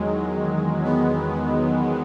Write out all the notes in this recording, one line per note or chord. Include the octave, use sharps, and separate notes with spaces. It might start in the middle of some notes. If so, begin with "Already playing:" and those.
Already playing: E2 D#3 F#3 G#3
B3